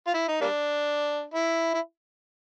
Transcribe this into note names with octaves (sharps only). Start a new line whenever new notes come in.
F4
E4
D#4
G3 A#3 D4
E4
E4